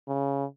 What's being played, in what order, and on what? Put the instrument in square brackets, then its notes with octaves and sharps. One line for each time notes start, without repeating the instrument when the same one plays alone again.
[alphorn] C#3